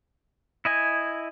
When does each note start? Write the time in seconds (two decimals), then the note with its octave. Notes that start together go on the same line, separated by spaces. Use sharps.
0.65 E4 D#5 G#5